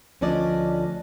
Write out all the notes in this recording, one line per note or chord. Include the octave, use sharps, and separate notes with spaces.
D2 F3 C#4 D4 D5 D#5